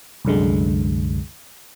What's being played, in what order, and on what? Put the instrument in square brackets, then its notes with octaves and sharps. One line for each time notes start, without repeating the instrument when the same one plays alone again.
[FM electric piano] C2 F#2 D3 G#3